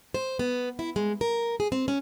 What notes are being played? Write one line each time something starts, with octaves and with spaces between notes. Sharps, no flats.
C5
B3
E4
G#3
A#4
G#4
C4
C#4